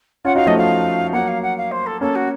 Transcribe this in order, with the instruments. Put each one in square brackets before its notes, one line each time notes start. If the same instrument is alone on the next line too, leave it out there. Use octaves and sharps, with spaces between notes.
[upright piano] C#4 F4 [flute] F#5
[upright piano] D#4 F#4 [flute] F5
[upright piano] F3 A3 [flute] D#5
[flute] F5
[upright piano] F#3 A#3 [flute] F#5
[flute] F5
F#5
F5
C5
A4
[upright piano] A#3 C#4 [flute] A4
[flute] F#4